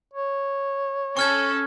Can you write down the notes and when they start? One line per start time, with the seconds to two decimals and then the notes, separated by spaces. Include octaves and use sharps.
0.14 C#5
1.17 C#4 A4 C#6 F6 G#6